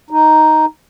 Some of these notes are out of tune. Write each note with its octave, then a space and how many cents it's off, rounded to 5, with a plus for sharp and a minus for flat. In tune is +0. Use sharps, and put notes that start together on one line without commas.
D#4 +0